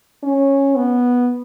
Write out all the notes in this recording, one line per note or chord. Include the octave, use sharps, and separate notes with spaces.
C#4
B3